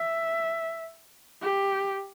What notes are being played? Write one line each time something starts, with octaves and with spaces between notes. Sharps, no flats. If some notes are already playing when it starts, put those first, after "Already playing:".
Already playing: E5
G4